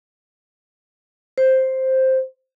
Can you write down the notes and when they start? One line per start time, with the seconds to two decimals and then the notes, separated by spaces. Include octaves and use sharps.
1.38 C5